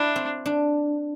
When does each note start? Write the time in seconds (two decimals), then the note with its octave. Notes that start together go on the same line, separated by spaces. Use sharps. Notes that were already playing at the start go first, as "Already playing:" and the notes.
Already playing: D4 E4
0.16 C4
0.46 D4